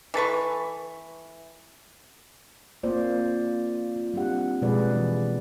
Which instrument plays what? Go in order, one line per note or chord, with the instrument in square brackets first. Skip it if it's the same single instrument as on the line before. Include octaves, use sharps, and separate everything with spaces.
[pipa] E3 A4 B4 C#6
[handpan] A#3 C4 F4 C5 D5
F4
G3 C4 D4 G4 F#5
B2 F3 G#3 G#4 B4 D5
E3